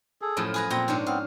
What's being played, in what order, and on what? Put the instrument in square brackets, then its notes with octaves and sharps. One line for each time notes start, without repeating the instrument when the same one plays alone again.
[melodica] G#4 A4
[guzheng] F#2 A2 F3
[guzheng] G#4 B4 A#5 [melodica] G#5
[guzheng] A#2 G5 A#5 [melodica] C4
[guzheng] G#2 C#4 D4
[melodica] B3 C4 [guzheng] F5